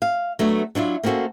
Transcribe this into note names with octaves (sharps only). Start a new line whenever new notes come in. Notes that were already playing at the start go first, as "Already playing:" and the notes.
F5
F#3 A3 B3 D4
F#3 D4 E4 F4
A#3 C4 C#4 F#4 A4